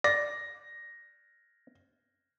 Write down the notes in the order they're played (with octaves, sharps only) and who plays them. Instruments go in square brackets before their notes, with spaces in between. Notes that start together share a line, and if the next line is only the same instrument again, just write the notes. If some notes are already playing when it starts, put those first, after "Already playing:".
[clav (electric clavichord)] D5 [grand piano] A#6